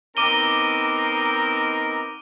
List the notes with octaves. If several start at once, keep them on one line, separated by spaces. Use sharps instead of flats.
B3 C4 D#4 A#4 D6 D#7 G7